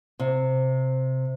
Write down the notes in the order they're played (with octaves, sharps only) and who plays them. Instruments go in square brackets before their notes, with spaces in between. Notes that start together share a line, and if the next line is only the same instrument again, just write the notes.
[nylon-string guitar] C3